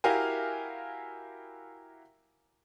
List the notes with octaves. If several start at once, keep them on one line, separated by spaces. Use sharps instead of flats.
E4 F#4 G4 A#4 F5 G#5